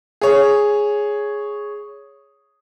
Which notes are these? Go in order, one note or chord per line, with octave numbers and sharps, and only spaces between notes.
G#4 C#5